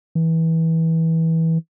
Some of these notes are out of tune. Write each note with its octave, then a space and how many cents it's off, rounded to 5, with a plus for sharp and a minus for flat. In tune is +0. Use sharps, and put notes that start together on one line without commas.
E3 -20